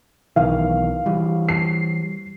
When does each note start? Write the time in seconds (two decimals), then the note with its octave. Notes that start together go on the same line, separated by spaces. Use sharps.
0.36 B1 D#3 E3 F5
1.06 E3 G3
1.49 C7